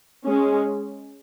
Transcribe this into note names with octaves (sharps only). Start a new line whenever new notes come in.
G#3 C#4